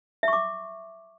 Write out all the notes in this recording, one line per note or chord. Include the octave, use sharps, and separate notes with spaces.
E5 C#6 D6